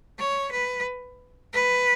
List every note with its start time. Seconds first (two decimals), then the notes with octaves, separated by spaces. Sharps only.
0.19 C#5
0.52 B4
1.54 B4